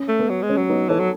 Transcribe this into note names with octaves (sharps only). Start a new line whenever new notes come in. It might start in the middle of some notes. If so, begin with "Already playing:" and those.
Already playing: C#4
A3
B3
F#3
G#3
C#4
F#3
B3 D#4
E3 A4 C#5
F#3